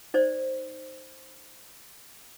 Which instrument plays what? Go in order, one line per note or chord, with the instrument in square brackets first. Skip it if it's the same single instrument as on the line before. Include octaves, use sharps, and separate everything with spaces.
[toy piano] D#4 C5 D5